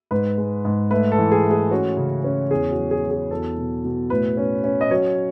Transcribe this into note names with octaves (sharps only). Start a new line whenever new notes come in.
G#2 B4
G#3
G#2
A3 B4
A4
E3
G#4
A3
G#4
C#4 F#4
C#3
C#4
E2 G#4
F#4
F#3
G#4
F#3
G#4
E2 A4
B2
B2
A2 B4
C#4
C#4
D#5
F#3 C#5